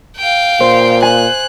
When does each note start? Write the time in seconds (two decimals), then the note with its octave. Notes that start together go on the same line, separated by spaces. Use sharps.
0.17 F5 G5
0.60 A#2 C5
1.02 G#5 F#6